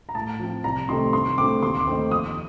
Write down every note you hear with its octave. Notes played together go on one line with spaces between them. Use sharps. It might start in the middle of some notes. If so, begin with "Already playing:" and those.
A#5
A2 A5
F3 C4
C2 A#5
C3 D#3 A3 C4 C6
G2 C6
D3 A3 C4 D6
D#2 C6
D6
D#3 A3 C4
F2 D#6